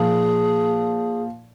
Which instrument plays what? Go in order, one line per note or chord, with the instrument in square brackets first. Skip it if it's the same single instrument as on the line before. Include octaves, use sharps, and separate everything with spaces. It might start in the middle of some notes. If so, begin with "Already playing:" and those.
Already playing: [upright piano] A#2 F3 A#3 D#4 [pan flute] G#4